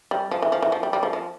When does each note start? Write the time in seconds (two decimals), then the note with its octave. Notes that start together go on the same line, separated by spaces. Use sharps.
0.11 G3
0.31 F3
0.42 E3
0.52 F3
0.62 E3
0.72 F3
0.83 G3
0.93 G3
1.03 F3
1.13 F3